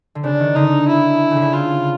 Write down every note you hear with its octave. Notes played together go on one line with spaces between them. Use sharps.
D3
C#3 D4
D#3
D3 D#4
E4
C#3
D3
C#3
F4